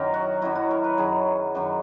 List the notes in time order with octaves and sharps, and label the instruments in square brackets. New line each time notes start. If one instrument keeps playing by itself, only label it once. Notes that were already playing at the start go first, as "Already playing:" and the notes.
Already playing: [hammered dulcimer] F#2 D#3 F#3 A#4
F#4
F#2 D#3 F#3 E4
F#4
A#4
B4
F#2 D#3 F#3 G#4
F#2 D#3 F#3 F#4